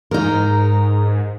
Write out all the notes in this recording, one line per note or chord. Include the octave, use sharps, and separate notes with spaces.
G#2 D#4 A#4